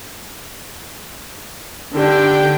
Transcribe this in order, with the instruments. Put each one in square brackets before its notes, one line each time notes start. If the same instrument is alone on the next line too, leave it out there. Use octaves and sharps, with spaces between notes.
[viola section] D3 D4 G5 [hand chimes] D#4 G4 D5